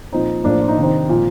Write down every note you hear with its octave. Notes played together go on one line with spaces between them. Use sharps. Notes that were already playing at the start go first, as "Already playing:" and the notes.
A#2 F3 C4 D#4
A2 F3 A#3 D4
F4
D#4
C3 D#3 D4
C4 D#4
A#2 F3